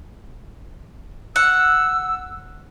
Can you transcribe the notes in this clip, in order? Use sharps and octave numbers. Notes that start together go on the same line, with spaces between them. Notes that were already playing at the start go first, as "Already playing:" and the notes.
F#5 E6